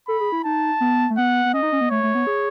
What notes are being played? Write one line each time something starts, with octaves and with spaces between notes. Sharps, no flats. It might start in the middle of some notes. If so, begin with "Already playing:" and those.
A4 B5
G#4
E4
D#4 A5
B3
A3
B3 F#5
B3
C#4 D#5
D#4
C#4
B3
A3 C#5
A3
B3
G#4